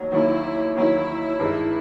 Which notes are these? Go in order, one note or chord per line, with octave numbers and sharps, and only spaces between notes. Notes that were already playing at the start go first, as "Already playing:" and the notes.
Already playing: D#2 D#3 F#3
D#2 D#3 F#3 E4
D#2 D#3 F#3 E4
G2 D#3 G#3